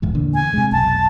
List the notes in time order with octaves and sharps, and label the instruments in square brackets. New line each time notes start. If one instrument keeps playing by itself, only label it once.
[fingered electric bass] D1 E2 G#2
E2 A#2 D3
[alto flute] G#5
[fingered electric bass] C3 G#3
[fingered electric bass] F1 B1 [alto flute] A5